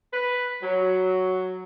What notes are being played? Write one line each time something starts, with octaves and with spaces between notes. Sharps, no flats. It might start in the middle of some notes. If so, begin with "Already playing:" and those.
B4
F#3